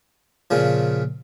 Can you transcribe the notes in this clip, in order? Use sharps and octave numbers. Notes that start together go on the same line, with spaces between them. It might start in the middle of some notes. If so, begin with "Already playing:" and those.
A#2 C#3 F3